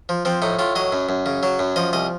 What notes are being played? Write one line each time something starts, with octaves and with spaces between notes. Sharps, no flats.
F3
F3 C4
A2 D#4
A2 F4
F#3 D#5
F#2
F#2
C#3
F#3
F#2
F3 D#5
C2 D#5